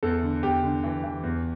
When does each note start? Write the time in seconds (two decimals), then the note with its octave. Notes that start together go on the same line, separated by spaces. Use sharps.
0.03 E2 A4
0.23 D3
0.43 E2 G4
0.63 D3
0.83 E3
1.04 E3
1.23 E2